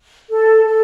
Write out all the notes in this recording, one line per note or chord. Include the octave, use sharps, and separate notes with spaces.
A4
A4